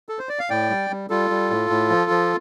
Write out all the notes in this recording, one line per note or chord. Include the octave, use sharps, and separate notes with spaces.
A4
C5
D5
F5
A2 D5 G5
G3
G3
G3 F4 A4
G3
A2
A2
F3
F3